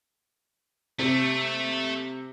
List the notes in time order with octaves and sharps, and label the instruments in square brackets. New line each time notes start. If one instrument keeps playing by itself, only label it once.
[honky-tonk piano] C3 [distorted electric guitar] A3